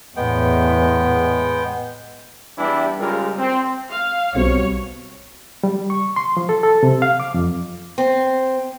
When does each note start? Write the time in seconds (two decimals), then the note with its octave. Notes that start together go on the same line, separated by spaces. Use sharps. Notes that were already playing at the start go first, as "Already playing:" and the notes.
0.16 E2 A2 G#3 B3 G5
2.58 E2 E3 G3 D4 E4 G4
3.00 C#3 G3 G#3 F4 A#4
3.38 C4
3.90 F5
4.35 B1 G3 C4 F#4 C#5
5.63 G3
5.90 C#6
6.16 C6
6.37 F3
6.49 A4
6.63 A4
6.83 C3
7.02 F5
7.20 D6
7.34 F2
7.98 C4